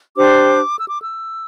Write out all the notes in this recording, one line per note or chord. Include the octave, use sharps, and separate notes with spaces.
D4 G4 C5 D6
E6
D6
E6